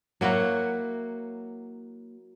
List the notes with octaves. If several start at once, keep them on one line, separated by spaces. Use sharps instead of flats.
F#3 A#3 E4 F#4